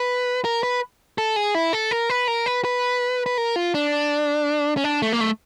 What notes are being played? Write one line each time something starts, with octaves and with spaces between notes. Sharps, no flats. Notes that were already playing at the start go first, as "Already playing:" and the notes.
Already playing: B4
A#4
B4
A4
G#4
E4
A4
A#4
B4
A#4
B4
B4
B4
A#4
F4
D4
C#4
D4
A3
A#3
A3